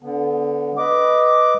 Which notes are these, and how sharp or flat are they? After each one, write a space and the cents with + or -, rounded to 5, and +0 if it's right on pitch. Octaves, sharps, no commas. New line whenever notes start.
D3 -20 B3 +0
B4 +0 D#5 +0 D6 +0